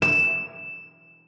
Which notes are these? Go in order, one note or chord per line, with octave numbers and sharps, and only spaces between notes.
E7